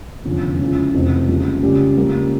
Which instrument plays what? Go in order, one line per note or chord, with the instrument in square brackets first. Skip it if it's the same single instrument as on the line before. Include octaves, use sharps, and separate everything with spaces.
[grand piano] F1 E2 D3 F3 C#4
C#2 C#3 F3 C#4 E4
F1 F2 E3
C#2 C#3 G3 A#3
C#2 C#3 G3 C#4 G4
C#2 C#3 G3 A#3